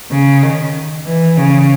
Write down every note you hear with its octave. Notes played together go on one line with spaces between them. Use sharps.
C#3
D#3
E3
C#3